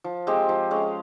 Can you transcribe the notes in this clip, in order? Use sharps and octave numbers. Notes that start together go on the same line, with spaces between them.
F3
G#3 C4 G4
F3
G#3 C#4